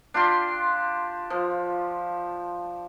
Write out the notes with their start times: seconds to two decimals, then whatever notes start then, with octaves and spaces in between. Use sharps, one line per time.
0.14 D4 F4 G4 C6
1.30 F3